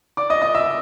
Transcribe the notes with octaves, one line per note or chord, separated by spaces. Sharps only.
D5 D6
D#5 D#6
D#5 D#6
E5 E6